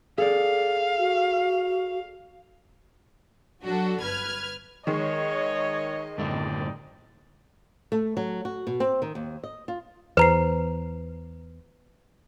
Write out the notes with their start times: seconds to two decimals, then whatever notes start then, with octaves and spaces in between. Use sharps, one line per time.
0.18 G#4 A4 D5 F5
0.99 F#4
3.63 F#3 D4 F#4 A4
4.02 G1 B4 F6 G#6
4.87 D#3 G#3 C#5 D#5
6.18 F#2 A2 D3 G3 D#4 D5
7.92 A3
8.17 F#3
8.45 F#4
8.67 B2
8.80 C4
9.02 D#3
9.15 D#2
9.43 D#5
9.68 F4
10.17 E2 B4 C5 A#5 C7